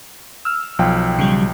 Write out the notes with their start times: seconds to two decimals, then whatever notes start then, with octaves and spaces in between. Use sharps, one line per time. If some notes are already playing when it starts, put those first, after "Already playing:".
0.45 E6 F6
0.79 B1 F3 G5
1.19 C#3 F#3 G3